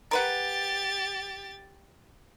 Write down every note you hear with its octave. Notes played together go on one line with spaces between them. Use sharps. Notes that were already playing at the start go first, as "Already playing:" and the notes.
G4 A#4 B4 F#5 A6